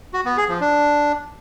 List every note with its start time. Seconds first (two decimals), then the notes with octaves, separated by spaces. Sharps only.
0.14 F#4
0.25 B3
0.37 G#4
0.49 F3
0.61 D4